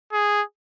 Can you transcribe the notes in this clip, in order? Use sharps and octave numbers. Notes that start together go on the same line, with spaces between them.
G#4